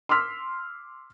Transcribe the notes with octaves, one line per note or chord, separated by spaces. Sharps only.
C6 D6 E6 F6 B6